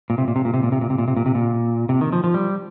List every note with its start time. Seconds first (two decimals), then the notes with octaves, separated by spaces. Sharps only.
0.10 A#2
0.18 C3
0.28 A#2
0.36 C3
0.45 A#2
0.54 C3
0.63 A#2
0.72 C3
0.81 A#2
0.90 C3
0.98 A#2
1.08 C3
1.17 A#2
1.26 C3
1.35 A#2
1.89 C3
2.01 D#3
2.12 F3
2.24 F3
2.34 G3